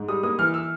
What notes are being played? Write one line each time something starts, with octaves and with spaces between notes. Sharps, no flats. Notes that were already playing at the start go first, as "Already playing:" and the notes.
Already playing: G#2
G3 D#6
A#3 D#6
E3 F6
E6